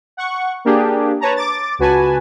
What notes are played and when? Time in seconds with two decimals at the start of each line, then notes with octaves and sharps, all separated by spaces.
0.17 F#5 C#6
0.65 A#3 D4 G4 G#4
1.21 B4 C#5 A5 A#5
1.36 D6 A6
1.79 C#2 F#4 B4 G#5 A5